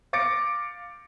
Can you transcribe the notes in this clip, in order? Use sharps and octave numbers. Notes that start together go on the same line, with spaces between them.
F5 D6 A6 A#6 C#7 D7